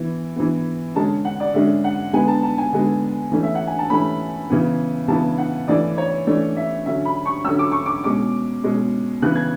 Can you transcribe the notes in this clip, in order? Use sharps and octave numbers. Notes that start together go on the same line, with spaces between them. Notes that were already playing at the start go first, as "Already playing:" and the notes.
Already playing: E3 B3
E3 B3
D3 G#3 C#4 A5
F#5
D5
D3 G#3 C#4 E5
F#5
D3 G#3 B3 G#5
A5
A5
G#5
D3 G#3 B3
E3 A3 C#4
E5
F#5
G#5
A5
E3 A3 C#4 B5
C#3 E3 B3
C#3 E3 B3 A5
F#5
E3 A3 C#4 D5
C#5
E3 A3 C#4 D5
E5
D3 F#3 C#4 E5
B5
C#6
D3 F#3 C#4 E6
D6
C#6
D6
B2 G#3 C#4 D6
B2 G#3 C#4
C#3 E3 B3 F#6
G#6